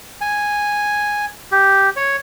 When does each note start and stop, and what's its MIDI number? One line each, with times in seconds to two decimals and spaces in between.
0.21 1.25 80
1.52 1.90 67
1.96 2.16 73